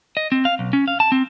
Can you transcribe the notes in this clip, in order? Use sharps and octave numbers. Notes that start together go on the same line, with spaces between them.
D#5
C4
F5
B1
C#4
F5
A5
C4